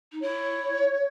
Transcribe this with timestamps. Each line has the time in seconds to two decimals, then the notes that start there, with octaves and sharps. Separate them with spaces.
0.12 D#4
0.21 E4 C#5